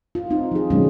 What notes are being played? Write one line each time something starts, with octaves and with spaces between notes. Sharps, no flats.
F4
C4 D#4
F3 G#4
B2 D#3 F#3 G#3 A3 C#4